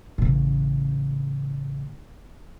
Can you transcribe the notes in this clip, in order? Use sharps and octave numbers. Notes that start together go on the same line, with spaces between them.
A1 C#3